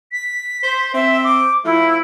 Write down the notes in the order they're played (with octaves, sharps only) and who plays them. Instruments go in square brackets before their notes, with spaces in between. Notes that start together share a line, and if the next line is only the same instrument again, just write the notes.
[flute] B6
[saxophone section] C5
[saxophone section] C4 [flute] E5
[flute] D6
[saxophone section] F3 A3 [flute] E4